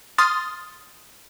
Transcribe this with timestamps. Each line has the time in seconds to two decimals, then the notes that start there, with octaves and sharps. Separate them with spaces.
0.18 C6 D#6 F6 A6